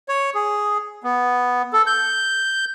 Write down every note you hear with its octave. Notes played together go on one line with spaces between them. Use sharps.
C#5
G#4
B3
A4
G6